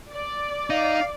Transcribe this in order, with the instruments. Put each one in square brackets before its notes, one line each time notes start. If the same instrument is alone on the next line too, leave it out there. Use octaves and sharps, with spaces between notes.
[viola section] D5
[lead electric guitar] D#4 [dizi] F5